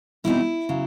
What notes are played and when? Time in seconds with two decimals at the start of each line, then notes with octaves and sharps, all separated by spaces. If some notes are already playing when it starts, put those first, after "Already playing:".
0.24 E2 B2 G3 C4 D#4 E4
0.69 C#3 F#3